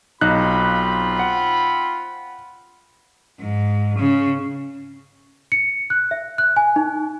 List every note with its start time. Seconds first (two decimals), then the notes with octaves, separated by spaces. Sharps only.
0.21 B1 C4 D#4 F4 B5 F#6
1.19 F#5
3.41 G#2
3.98 C#3
5.52 C#7
5.90 F#6
6.11 E5
6.38 F#6
6.56 G#5
6.76 D#4